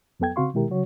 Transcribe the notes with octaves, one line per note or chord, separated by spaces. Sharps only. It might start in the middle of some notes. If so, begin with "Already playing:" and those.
F2 F#3 B3 A4 G5 G#6
C#3 C4 F#4 F5 C6 C#6
B2 D#3 G#3 E4 G4 A#4
C#3 F#3 F#4 C#5